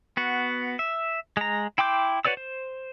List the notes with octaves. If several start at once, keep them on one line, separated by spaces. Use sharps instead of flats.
B3 F#4
E5
G#3 A#5
E4 G5 C6 D6 G6
F#4 B4 C#5 D5 E6
C5